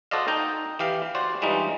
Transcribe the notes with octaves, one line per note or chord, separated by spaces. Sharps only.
F#4 A4 C5 D5 D#5 F5
D#4 D#5 G5
E3 G4 F5
F#4 C5 D5
G2 E3 G3 G#3 D#4 F4